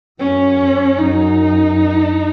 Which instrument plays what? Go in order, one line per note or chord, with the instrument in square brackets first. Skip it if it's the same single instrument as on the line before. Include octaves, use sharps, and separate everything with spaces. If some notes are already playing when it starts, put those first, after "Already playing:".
[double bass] F#2 [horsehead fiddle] C#4
[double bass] F#2 [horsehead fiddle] D#4